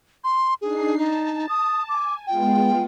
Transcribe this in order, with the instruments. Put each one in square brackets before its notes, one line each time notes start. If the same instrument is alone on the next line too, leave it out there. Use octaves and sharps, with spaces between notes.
[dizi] C6
[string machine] D4 D#4 C7 [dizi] G#4
[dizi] D#4 [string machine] A5
[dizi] D#6
[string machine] G#5 [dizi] D6
[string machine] G#3 B3 F4 [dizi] G5